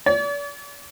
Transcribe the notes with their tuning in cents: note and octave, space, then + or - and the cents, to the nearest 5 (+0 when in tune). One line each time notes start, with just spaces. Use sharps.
D5 -40